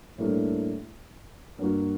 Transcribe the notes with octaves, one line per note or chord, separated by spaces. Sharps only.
A2 G3 A#3 D4 A4
G2 F#3 A#3 F#4